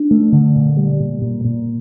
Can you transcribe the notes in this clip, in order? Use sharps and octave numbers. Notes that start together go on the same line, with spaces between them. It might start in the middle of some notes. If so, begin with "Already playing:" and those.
Already playing: D4
A3
D3
A#2
G3
A#2
A#2
A#2